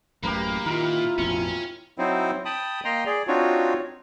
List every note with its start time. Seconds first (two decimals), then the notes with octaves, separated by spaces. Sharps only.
0.23 A1 F#2 A2 A#3 G4 A#4 B4
0.66 A#2 D#3 E4 F4 A#4
1.18 A1 F2 B2 C#4
1.98 F#3 C4 D#4 E4 C5
2.45 G5 A5 B5 D#6
2.85 A#3 D#5 G5 A#5 C6
3.06 G#4 D5
3.27 C4 D4 D#4 F4 F#4 C#5